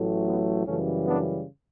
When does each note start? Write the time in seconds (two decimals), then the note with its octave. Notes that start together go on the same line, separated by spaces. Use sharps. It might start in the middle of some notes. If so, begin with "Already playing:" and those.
Already playing: A1 A2 F#3 A3
0.25 B3
0.65 F#2 C#3 E3 G3 A3 C#4
1.06 B3 D4